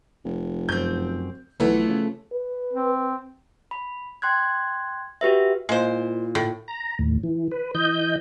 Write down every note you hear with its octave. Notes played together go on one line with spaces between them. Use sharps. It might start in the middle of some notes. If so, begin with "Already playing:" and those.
F1
F#2 C4 G6
B1 E3 F3 A3 B3 A4
C#3
B4
C4
B5
G5 C6 F#6 G#6
F#4 G4 B4 E5
A#2 G#3 E4 C5
A2
A#5
D#2 A2
E3
B4
E3 D#5 G6